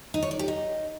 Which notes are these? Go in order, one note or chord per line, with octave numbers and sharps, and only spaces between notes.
D#4
C#5
D5
G4
D#4